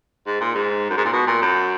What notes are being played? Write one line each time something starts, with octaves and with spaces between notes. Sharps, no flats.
G#2
A#2
G#2
F#2
G#2
A#2
B2
A#2
F#2